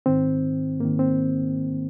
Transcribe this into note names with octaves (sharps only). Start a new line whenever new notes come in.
G#2 D#3 C4
G#2 D#3 A#3
C4